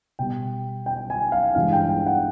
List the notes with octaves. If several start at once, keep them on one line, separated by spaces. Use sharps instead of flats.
B2 G3 G5
G5
G#5
F5
G2 E3 G#3 F5
G5
G5
F#5